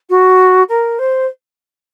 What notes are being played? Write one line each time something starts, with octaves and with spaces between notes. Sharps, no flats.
F#4
A#4
C5